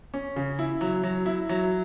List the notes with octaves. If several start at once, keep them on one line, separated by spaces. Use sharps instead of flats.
C#4
C#3
E4
F#3
F#3
E4
F#3